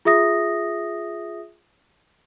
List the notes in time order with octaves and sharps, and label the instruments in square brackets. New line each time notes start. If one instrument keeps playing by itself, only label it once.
[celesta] F4 G#4 E5 D#6 A#6